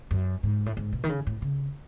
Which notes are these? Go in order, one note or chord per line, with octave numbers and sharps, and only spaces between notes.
F#2
G#2
A2
G#2
B2
D#3
C#3
A2
C#3